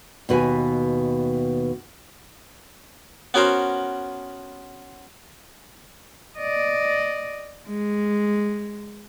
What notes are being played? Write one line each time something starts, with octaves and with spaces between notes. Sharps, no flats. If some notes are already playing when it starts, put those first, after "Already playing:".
D#2 B2 B4 G#5
B3 C#4 F#4 A#4 C5
D5 D#5
G#3